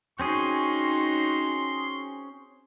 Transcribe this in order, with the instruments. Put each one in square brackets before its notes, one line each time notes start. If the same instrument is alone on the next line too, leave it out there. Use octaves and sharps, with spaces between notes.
[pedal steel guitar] C4 C#4 G#4 [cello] D#4 F#4 [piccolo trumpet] C6